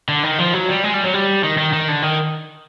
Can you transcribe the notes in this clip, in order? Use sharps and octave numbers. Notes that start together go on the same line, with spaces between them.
D3
D#3
F3
F#3
G3
G#3
G3
F#3
G3
D#3
D#3
D#3
D3
D#3